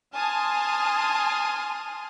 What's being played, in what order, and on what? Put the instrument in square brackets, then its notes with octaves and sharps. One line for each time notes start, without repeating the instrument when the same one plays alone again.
[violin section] G#5 A5 C6 D#6 F6